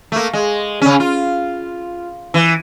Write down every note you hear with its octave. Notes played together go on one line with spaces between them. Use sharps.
A3 A#3
G#3
C#3 C#4
F4
E3